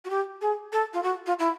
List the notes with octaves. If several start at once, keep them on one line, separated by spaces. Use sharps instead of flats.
F#4
G4
G#4
A4
F4
F#4
F4
E4